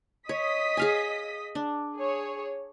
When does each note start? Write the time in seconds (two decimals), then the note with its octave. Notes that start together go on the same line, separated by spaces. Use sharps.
0.29 C#5 D#5 D#6 B6
0.77 G#4 F5 G#5
1.55 D4
1.96 G#4 C#5